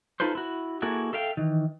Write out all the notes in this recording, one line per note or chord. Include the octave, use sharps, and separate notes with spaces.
D#4 F4 A4 B4 C5
E4 F#4
A#3 E4 F#4 G#4 A4
A4 E5 F5 G5
D#3 E3